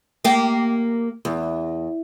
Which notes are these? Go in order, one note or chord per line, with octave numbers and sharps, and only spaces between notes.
A#3 G4
E2